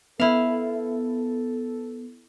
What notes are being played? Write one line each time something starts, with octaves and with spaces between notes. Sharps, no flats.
B3 E4 A4 F5